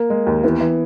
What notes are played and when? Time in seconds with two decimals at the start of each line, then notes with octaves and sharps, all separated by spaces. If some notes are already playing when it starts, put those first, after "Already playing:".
Already playing: A#3
0.10 G#3
0.27 D#2
0.43 E3 B3
0.60 E3